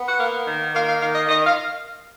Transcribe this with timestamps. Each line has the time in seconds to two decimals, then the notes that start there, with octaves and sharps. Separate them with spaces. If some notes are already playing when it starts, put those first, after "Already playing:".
Already playing: B3
0.08 F#5
0.20 A#3 F5
0.47 D#3
0.73 A#3 F5
0.87 F5
1.01 D#3 F5
1.14 D#5
1.28 D#3 D#5
1.46 F5